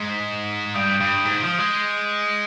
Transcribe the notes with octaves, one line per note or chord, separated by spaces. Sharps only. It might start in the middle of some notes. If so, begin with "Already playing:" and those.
Already playing: G#2 D#6 B6
G2 D#6 G6 D7
G2
G#2
F3
G#3